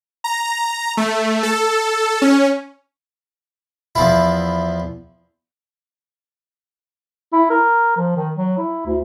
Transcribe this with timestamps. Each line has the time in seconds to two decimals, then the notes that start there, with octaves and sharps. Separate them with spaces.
0.24 A#5
0.97 A3
1.43 A4
2.22 C#4
3.95 E2 F3 E4
7.33 E4
7.50 A#4
7.97 F3
8.16 D#3
8.35 F#3
8.57 E4
8.86 D2